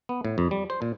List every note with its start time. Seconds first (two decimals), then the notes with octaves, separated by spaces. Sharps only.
0.09 B3
0.25 A2
0.38 F2
0.51 G3
0.70 C5
0.82 A#2